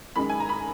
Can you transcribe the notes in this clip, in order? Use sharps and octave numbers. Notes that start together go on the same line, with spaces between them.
F#2 D#3 G#3 B5
G#5
A#5
B5